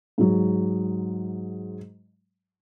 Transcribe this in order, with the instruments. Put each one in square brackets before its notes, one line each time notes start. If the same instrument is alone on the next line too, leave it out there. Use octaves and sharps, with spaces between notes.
[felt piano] G#2 F#3